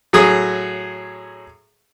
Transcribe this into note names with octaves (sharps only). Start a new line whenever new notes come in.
A2 F#3 G#4 D#6